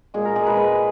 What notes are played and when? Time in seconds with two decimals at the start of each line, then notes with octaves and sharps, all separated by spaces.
0.14 A#2 G#3 G#4
0.25 A#4
0.36 G#4
0.47 B4
0.57 B4